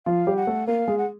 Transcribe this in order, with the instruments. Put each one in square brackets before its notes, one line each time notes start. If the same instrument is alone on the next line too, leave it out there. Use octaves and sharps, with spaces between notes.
[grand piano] F3 F4 [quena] F5
[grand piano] G3 G4
[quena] F#5
[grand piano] A3 A4
[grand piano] A#3 A#4 [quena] F5
[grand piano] G#3 G#4
[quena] F#5